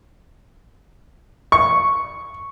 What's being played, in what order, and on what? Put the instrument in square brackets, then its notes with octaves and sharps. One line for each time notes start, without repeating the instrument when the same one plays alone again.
[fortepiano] C#6